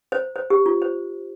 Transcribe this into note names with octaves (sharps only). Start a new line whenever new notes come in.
C5
C5
G4
F4
C5